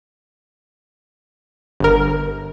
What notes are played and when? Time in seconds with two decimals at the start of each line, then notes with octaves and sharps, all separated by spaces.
1.80 G1 A#4